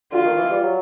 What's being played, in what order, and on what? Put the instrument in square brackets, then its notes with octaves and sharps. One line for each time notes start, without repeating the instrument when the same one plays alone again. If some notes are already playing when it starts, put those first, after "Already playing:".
[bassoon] D3 [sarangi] F4
[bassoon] D#3
E3
G3
F#3